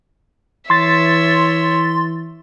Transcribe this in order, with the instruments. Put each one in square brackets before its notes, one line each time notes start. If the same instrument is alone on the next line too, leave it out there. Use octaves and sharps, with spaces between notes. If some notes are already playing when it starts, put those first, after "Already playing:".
[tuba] E3 [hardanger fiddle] C#5 E5 [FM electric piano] C6 A6